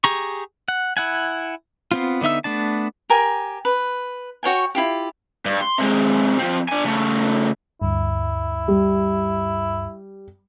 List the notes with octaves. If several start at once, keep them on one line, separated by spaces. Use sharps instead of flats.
G4 G#4 A#5 C#6
F#5
E4 F#5 G#5
B3 C4 F4
D3 B3 D#4 E5 E6
A3 B3 D4 A5
G4 A#4 G#5
B4
F#4 C#5 G5 G#5
E4 F4 G4
G2
C6
C3 G#3
F3 C4
D4 G#5
C#3 A3
D2 G2 E4
G3